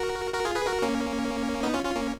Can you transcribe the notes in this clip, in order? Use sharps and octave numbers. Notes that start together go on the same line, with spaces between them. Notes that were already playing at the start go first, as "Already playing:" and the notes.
Already playing: F#4 A#4
F#4 A#4
F4 G#4
G#4 B4
F#4 A#4
A#3 C#4
B3 D#4
C#4 F4
C#4 F4
A#3 C#4